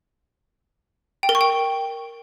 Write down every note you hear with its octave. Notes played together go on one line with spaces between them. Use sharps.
G5
A#4
C#6
G5